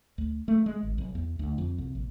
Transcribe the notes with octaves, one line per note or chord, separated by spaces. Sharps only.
D2
A3
G#3
G#1
B1
E2
D2
F2
C2
A#1